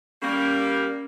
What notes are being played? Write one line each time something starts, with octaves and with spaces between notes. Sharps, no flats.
G3 A#3 C#4